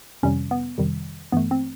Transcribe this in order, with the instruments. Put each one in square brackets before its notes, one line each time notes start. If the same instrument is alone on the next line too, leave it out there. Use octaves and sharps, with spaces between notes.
[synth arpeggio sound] F2 C3 D#3 G3 C#4
B3
F2 C3 D#3 G3
G2 E3 A3 B3
C4